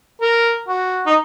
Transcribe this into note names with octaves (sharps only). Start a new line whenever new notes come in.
A#4
F#4
D#4